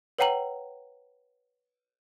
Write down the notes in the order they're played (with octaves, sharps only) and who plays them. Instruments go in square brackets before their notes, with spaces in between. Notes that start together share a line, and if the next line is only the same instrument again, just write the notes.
[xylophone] B4 C#5 F#5 G5 A#5 F#7